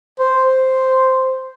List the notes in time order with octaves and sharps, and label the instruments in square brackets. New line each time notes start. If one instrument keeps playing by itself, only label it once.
[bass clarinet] C5